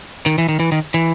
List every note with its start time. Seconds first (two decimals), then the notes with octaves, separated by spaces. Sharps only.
0.26 D#3
0.38 E3
0.49 D#3
0.60 E3
0.72 D#3
0.94 E3